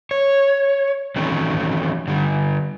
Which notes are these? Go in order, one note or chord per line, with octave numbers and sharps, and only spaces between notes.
C#5
D#3 E3 F#3 A3 C4 C#4
D3 G3